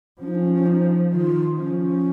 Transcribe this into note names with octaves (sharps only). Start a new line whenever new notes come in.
F3 C#4
D#4
C#4
C#4
D#4
D#3 F4
F3 C#4